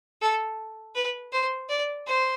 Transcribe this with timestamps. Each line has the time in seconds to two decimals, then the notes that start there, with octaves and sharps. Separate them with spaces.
0.21 A4
0.95 B4
1.32 C5
1.69 D5
2.06 C5